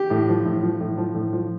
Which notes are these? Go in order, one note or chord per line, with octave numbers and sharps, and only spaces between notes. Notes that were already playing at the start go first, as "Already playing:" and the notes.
Already playing: G4
A2
F3
A2
F3
A2
F3
A2
F3